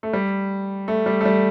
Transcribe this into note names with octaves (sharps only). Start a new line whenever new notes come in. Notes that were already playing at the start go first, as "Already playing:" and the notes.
A3
G3
A3
G3
A3
G3